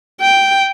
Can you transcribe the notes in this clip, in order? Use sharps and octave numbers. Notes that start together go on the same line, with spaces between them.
G5